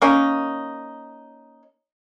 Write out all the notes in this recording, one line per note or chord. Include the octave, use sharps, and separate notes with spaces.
A#3 C#4 D#4